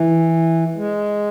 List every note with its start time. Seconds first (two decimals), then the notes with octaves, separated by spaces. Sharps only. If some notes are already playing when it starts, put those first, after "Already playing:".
Already playing: E3
0.76 G#3